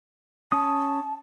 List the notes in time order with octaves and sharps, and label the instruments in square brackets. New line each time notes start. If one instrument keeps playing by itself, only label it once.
[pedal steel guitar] C#4 D#6 [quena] A5